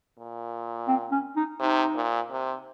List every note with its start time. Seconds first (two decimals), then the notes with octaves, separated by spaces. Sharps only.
0.18 A#2
0.88 C4
1.12 C#4
1.36 D#4
1.60 C3 D#4
1.95 A#2
2.30 C3